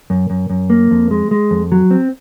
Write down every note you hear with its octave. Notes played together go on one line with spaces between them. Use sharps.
F#2
F#2
F#2
A#3
F2
G#3
G#3
F2
F#3
C4